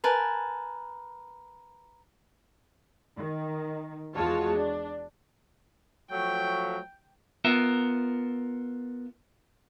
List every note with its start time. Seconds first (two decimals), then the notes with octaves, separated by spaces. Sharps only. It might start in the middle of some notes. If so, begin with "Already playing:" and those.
0.04 A#4 B4 G#5 A5
3.16 D#3
4.14 E2 G#3 F4 F#4 C#5 A5
4.55 D4
6.11 F3 F#3 A3 G5
7.44 B3 F4 A#4 E5